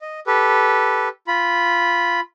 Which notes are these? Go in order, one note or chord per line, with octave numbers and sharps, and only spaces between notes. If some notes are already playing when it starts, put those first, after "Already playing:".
D#5
G4 A4 B4
F4 B5